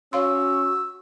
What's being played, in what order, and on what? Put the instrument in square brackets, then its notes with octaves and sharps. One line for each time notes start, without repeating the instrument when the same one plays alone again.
[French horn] C#4 [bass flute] F#4 [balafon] C#5 F5 C6 [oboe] E6